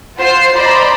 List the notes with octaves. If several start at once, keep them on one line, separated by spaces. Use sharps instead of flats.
F4 C5 F#5 C7
C5 D5 D#5 A#5 B5